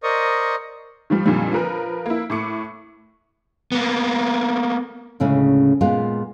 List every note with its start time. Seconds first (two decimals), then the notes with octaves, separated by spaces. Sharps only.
0.03 A#4 C5 D5 D#5 C#6 D#6
1.10 D#3 F3 G3
1.26 F2 A#2 D3 D#3 F3 G3
1.53 F3 A#4 B4
2.06 A#3 E4
2.30 A2 A3 D6 C#7
3.72 A#3 B3
5.20 D2 A2 C#3 G#3 C#4
5.81 A#2 G#3 B3 F4